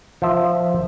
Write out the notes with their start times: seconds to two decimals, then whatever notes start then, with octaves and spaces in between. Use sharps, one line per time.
0.22 F3 E5